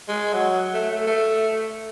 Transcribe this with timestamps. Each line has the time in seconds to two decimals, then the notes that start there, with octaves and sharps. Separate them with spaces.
0.08 G#3
0.33 F#3
0.74 A3
0.91 A3
1.07 A3